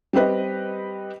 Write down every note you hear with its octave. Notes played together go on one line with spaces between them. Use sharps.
G3 C4 G4 B4 D#5